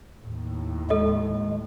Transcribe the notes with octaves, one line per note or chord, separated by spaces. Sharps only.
D#2 A2
G#3 A4 D#5